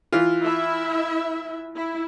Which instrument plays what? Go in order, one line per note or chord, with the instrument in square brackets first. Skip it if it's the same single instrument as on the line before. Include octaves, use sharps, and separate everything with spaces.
[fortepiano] E3 F4
[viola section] E4 E5
E4